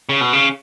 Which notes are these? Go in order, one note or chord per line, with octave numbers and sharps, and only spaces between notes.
C#3
B2
C#3